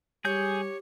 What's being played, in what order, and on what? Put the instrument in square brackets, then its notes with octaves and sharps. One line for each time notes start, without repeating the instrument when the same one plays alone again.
[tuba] G3 [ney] G4 [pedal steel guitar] G#4 G6 [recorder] C#5